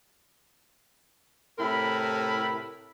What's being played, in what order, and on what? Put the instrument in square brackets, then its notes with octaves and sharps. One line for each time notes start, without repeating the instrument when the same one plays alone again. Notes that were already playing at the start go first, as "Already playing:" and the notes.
[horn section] A2 C3 E4 A#4 E5 B5